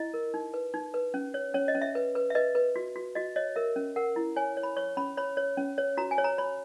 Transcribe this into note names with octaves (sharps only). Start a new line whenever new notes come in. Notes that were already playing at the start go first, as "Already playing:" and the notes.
Already playing: E4 D#5
A#4
D#4
B4
D#4
B4
C#4
C#5
C#4 C#5
D#5
C#4
E5
B4
B4
E5
B4 D#5
B4
F#4
F#4
F#4 D#5
C#5 D#5
A#4 E5
C#4
A#4 F#5
E4
C#5 G#5
C#5
B5
C#5 C#6
C#4 B5
C#5 B5
C#5
C#4
C#5
F#4 A#5
G#5
C#5
A#5
C#5 B5